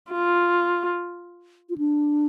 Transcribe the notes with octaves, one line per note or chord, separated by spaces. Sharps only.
F4
F4
D4